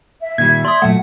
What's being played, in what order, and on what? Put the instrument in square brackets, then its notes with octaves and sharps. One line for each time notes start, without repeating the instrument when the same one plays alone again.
[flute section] E5
[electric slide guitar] A#2 D#3 G3 [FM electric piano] G#6
[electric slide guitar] D5 [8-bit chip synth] C6 D#6
[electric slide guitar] A#2 F#3 A3 [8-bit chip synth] F#5